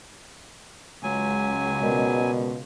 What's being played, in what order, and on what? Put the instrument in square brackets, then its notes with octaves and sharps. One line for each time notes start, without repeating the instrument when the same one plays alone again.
[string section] C#2 [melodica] F#3 G#5
[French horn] B2 [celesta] A#4 D5 D#5